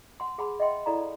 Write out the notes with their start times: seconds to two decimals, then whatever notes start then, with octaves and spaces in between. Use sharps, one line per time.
0.20 F#5 C6
0.38 G#4 F#5 A5 B5 C6
0.60 D#5 E5 F#5 G5 C6
0.86 E4 A4 D5 F5 A#5 B5